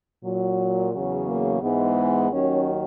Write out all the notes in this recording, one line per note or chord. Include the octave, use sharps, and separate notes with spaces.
A#2 F#3
E2 C#3 F#3
A#3
G#2 E3 G#3 B3
D#2 D#3 F#3 C#4